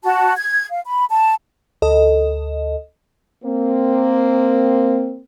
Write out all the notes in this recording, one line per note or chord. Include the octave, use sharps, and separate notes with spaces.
F#4 A5
G#6
F5
B5
A5
D2 A4 D#5
A#3 C4